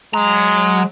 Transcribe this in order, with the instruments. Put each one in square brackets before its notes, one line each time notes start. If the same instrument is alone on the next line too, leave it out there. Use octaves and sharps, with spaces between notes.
[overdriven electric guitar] F#3 A#5 [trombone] G#3